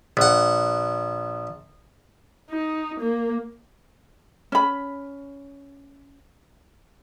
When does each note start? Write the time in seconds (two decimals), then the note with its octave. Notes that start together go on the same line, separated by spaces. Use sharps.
0.17 A#1 F#5
2.50 D#4
3.00 A#3
4.52 C#4 B5